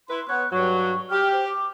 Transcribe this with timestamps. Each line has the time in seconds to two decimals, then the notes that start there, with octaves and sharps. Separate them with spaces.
0.09 E4 B4 C6
0.29 B3 C#5 F#6
0.52 G2 F#3 C#6
1.10 G4 F6
1.33 C5
1.49 D6